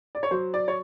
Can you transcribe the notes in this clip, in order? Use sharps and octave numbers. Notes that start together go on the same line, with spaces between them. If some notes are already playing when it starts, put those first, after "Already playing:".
D5
C#5
F#3 C5
D5
C#5